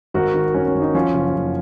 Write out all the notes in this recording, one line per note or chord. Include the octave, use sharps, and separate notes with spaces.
G#1 F#4 A#4
D#3
G#1 C#4
C#4
G#1
D#4
F3 C#4 F4
F#1
F#1